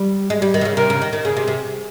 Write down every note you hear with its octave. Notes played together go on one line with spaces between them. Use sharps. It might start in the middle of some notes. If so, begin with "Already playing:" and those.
Already playing: G3
G#3
G3
D#3
C3
C#3
C3 A#4
C#3
D#3
D#3
C#3 G#4
C3
C3